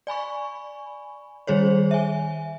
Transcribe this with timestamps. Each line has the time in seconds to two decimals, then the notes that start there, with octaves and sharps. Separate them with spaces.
0.07 D5 G#5 B5 C#6
1.47 D#3 G3 G#4 C5 C#5
1.91 E5 G#5